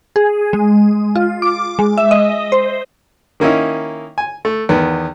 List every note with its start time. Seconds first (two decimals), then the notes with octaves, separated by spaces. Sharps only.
0.16 G#4
0.53 G#3
1.16 F4
1.42 D6
1.79 G#3
1.98 E5
2.11 D#5
2.52 C5
3.40 D#3 A#3 C#4 D#4 E4
4.18 G#5
4.45 A3
4.69 E2 D#3 B3